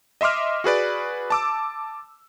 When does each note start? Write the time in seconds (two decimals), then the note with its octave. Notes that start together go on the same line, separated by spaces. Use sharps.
0.21 D#5 E5 C6 D6 F6
0.64 F#4 G#4 B4 D5
1.30 A5 D6 E6